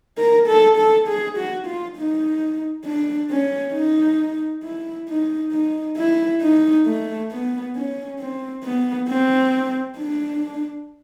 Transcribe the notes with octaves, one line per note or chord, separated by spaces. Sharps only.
A#4
A4
A4
G#4
F#4
F4
D#4
D4
C#4
D#4
E4
D#4
D#4
E4
D#4
A3
B3
C#4
C4
B3
C4
D4